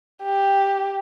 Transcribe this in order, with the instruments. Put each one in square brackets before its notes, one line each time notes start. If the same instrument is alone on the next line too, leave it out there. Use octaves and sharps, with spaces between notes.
[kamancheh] G4